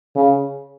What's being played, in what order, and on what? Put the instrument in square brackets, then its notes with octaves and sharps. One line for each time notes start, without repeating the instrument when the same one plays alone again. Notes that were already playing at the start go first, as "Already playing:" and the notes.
[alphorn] C#3